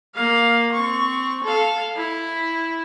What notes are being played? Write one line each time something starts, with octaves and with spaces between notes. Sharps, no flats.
A#3 F5
C4 C#6
A4 F5
E4